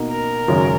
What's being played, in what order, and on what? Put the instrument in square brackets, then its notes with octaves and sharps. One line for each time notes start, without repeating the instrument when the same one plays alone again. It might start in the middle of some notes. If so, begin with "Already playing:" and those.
Already playing: [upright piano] B2 A#3 D#4
[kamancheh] A#4
[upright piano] G#1 F#2 C#3 G#3 C#4